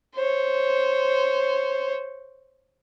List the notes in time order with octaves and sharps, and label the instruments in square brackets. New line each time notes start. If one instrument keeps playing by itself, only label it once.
[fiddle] C5 C#5